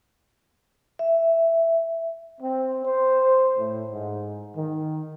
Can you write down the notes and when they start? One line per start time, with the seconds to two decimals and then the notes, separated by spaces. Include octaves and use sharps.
0.99 E5
2.41 C4
2.85 C5
3.58 A2
3.92 G#2
4.56 D#3